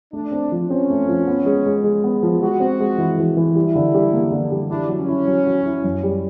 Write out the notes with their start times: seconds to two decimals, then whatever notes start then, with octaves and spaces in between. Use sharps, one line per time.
0.13 A3 D4
0.32 C4
0.52 F3
0.70 C4 C#4
0.90 A3
1.09 F3
1.27 B3
1.46 G#3
1.66 G#3
1.84 G#3
2.04 B3
2.23 F3
2.42 G#3 F#4
2.60 C4
2.80 G#3
2.98 E3
3.18 E3
3.37 E3
3.56 G3 E4
3.76 D3
3.94 G3
4.13 A#3
4.32 D3
4.52 G3
4.70 D4 E4
4.89 F#3
4.98 C#4
5.08 E4
5.28 F#3
5.46 F#3
5.66 E4
5.84 F#2
6.03 G3